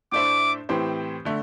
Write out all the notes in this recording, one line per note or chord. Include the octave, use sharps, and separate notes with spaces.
A2 A3 D4 C5 E5 D6
A2 E3 C4 G4 C5
D3 A3